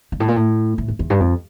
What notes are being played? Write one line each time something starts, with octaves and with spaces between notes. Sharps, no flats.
G2
A2
A#2
A2
A2
F2
E2
G2
F2